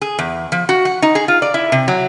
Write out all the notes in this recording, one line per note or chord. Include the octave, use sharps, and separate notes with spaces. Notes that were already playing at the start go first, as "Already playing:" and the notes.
G#4
E2
F3
F#4
F#5
D#4
G#4
F4
D5
E4
C3
F#3